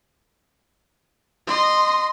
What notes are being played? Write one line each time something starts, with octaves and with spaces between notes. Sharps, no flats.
D#5 C6